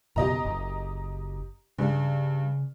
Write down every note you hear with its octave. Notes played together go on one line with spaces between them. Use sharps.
C#2 F#2 B2 G4 D#5 A#5
F#1
G2 C#3